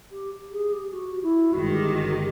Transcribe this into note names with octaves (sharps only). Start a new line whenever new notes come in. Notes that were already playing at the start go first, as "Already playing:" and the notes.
G4
G#4
G4
F#4
E4
G1 G2 D#3 G#3 F#4
G4
F#4
G4